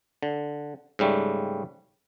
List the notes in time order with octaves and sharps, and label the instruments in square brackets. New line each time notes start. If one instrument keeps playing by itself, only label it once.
[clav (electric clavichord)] D3
G#2 C#3 G3 A3